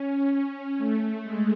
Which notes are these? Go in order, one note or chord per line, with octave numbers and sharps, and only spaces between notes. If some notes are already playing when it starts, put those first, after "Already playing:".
Already playing: C#4
A3
G#3